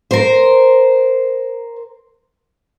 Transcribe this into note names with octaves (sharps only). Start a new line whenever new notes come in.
A#4 C5